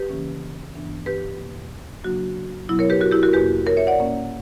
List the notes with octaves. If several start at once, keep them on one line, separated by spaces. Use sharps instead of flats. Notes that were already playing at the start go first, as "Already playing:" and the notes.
Already playing: G4 B4
C#3 E3 A#3 C#4
G2 E3 B3 D4
G4 B4
E2 B2 A#3
C#3 F#3 A#3 D4 F#4
B2 F#3 B3 E4
A#4 C#5
G4 B4
F#4 A#4
E4 G4
F#4 A#4
E2 B2 A#3 G4 B4
A#4 C#5
C#5 E5
D5 F#5
A#2 A#3 C#4